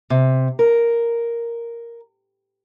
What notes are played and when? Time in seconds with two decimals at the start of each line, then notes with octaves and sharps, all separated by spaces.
0.10 C3
0.59 A#4